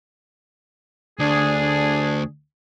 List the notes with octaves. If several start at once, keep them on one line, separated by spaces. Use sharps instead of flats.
D2 D4 G#4